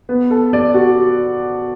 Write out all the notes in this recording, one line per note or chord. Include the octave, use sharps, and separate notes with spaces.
B3
A4
D5
F#4